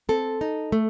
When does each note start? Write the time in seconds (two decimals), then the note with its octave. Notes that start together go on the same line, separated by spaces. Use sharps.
0.09 C4 A4
0.41 D#4
0.72 A3